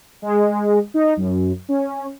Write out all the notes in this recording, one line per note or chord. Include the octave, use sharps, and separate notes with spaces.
G#3
D#4
F#2
C#4